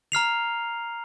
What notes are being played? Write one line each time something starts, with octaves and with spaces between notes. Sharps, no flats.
A#5 F6 C7 F7